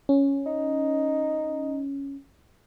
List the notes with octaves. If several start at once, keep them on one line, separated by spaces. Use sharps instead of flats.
C#4
D#4